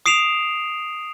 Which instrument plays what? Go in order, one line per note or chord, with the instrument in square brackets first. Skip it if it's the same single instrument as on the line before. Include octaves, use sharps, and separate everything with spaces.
[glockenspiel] D#6 C7 D7 E7 F7